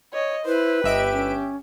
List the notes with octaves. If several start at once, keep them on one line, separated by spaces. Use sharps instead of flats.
C#5 D#5
E4 B4 C5
G1 G4 D#5 E5 D7
C#4